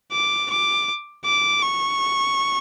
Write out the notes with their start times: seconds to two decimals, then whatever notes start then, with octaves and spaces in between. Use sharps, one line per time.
0.13 D6
0.51 D6
1.26 D6
1.63 C#6